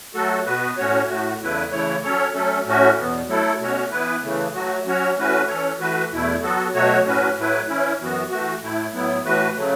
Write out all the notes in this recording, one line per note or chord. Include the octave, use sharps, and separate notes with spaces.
F#3 A3 F#4 A4
B2 B3 F#4 B4
A2 A3 C#4 F#4 C#5
A2 A3 F#4
E2 C#3 A3 E4 B4
C#3 E3 A3 E4 C#5
F#3 C#4 A4 C#5
F#3 A3 C#4 A4
A2 A3 C#4 F#4
E2 B2 B3
F#3 A3 E4 A4
B2 A3 C#4 F#4 C#5
E3 B3 E4 B4
C#3 E3 A3
F#3 A3 F#4
F#3 C#4 F#4 C#5
E3 A3 C#4 F#4 B4
E3 C#4 A4 C#5
E3 A3 F#4 B4
E2 B2 A3 E4
F#3 B3 F#4 A4
B2 F#3 A3 F#4 C#5
A2 F#3 C#4 F#4 B4
A2 F#3 A3 E4 B4
E3 C#4 E4
F#2 E3 B3 F#4
E3 A3 F#4
A2 A3 E4
A2 F#3 B3 E4
A2 E3 A3 F#4 B4
C#3 F#3 A3